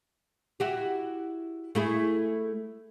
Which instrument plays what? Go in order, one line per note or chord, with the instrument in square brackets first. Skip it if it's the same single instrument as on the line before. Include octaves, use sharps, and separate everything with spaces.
[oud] E4 F#4 G4
A3 E4 G#4